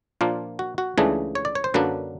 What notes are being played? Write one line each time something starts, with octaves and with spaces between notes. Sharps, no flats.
A#2 F3 A#3 D4 F4
F#4
F#4
C#2 C#3 E3 A3 D4 G#4
C#5
D5
C#5
C5
F#2 D3 F#3 A#3 D4 B4